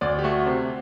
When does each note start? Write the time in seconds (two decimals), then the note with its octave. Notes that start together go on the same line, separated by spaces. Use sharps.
0.01 D2 D5
0.18 G4
0.24 A3 F#4
0.46 C3 C4